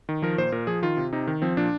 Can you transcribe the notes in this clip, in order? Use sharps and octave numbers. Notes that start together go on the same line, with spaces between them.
D#3
F3 A#4
A#2 C5
A#2 A#4
F3 G#4
D#3 F4
C3
C3 D#4
D#3
F3 C4
A#2 D4